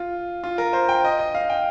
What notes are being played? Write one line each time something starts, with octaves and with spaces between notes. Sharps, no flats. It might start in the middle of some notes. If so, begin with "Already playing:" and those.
Already playing: F4
F4
A#4
C5
G5
D#5
D#5
F5
G5